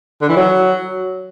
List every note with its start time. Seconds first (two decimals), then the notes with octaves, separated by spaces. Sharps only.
0.22 D3
0.29 E3
0.36 F#3